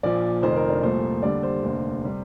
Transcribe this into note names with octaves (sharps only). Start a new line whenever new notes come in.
A#1 A#2 F3 D5
F1 F2 D#3 C5
A#4
D4
C2 A#2 F3 A3 C5
D#2 D3 G3 D5
C5
F1 D#2 D3
C3 G3